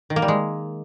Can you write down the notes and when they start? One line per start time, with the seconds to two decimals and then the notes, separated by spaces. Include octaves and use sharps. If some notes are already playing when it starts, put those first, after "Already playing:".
0.10 D#3
0.16 A#3
0.22 G3
0.28 G#3